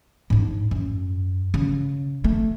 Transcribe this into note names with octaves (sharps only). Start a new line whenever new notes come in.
G#2 D4
F#2
C#3
A3